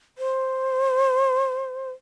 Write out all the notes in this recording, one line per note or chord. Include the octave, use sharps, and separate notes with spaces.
C5